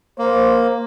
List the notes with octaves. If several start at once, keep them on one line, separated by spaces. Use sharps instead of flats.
A#3 C5